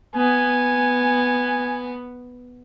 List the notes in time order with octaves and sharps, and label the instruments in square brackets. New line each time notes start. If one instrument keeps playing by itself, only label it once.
[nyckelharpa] B3 [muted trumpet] G#5